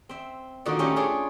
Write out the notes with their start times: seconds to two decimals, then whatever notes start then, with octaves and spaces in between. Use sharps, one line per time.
0.09 C4 E5
0.65 A#2 D3 D#3 F3 D#4 F#4
0.79 A3 C#4 F4 G4 A#4 C#5
0.96 D4 F4 G#4 C#5